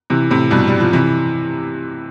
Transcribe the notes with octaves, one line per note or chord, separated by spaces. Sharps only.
C3 E3
A2 C3
G2 B2
G3
F3
C3 E3